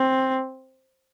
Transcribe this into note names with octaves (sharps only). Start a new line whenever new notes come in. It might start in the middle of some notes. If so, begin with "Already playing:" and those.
Already playing: C4